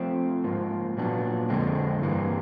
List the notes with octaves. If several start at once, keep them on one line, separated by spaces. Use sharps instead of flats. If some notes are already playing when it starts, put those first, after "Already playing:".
Already playing: F3 A3 C4
G#2 F3 A#3
A#2 F#3 B3 D4
F2 D3 F3 G#3 C4
G2 E3 G3 A#3